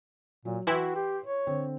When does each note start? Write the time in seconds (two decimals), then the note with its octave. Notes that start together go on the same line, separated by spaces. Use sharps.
0.45 A#2 F#3
0.67 E3 E4 F#4 B4 G5 C6
0.96 G4
1.24 C#5
1.47 D3 C4